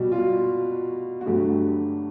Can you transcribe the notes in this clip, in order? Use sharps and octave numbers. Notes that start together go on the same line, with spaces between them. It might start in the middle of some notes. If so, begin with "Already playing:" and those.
Already playing: B2 G3 F#4
F4
F#4
G2 D3 F#3 A3 G4